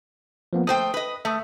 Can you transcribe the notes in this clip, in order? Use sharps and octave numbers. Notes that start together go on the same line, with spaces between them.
F3 A#3 B3
A3 C5 G5 D#6
B4 D#5
A3 E5 D#6